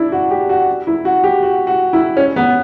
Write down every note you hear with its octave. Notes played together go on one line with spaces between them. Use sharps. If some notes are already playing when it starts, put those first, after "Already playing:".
Already playing: D4 E4
F#4
G4
F#4
E4
F#4
G4
F#4
F#4
E4
C#4
B3